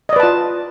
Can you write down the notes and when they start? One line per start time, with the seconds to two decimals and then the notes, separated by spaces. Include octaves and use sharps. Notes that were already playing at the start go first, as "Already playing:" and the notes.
0.09 D#5
0.13 D5
0.16 B4
0.20 A5
0.23 F4